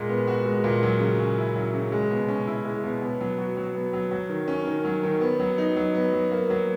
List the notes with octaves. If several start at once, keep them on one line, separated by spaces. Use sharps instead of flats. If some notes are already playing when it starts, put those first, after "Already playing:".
Already playing: A#2 G#3
B3
F#4
G#3
A#2
F#3
C#3
C#4
E4
F#3
C#3
G#3
B2
C#4
E4
G#3
B2
B3
F#3
F#4
F#3
B3
F#3
F#3
D#3
C#4
D#3
F#3
D#3
B3
F#3
D#4
F#3
B3
F#3
A#3
F#3